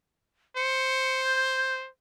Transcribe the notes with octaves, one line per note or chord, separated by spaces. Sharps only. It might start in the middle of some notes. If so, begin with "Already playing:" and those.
C5 C#7
G6